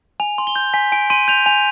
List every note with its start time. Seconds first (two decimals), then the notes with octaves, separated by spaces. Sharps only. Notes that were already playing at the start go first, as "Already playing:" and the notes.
0.20 G#5 F7
0.38 C6
0.47 G7
0.56 G6
0.74 G#5 B6
0.92 G#5 D7
1.10 C6 D#7
1.28 G6 F7
1.46 G#5 F7